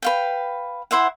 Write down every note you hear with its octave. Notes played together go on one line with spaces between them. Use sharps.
B4 F5 G5
E4 C5 E5 F#5